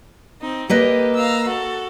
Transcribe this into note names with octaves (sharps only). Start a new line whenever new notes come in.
C4 D#4
A#3 G4 A4 B4 D#5
F5 A#5 E6
F#4 A4